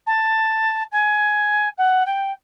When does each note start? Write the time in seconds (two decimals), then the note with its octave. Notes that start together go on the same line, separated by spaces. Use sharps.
0.06 A5
0.92 G#5
1.78 F#5
2.06 G5